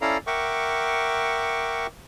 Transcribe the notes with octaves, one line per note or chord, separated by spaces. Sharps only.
C#4 E4 A4 D5 F5 A#5
A#4 E5 F#5 G5 C#6 D6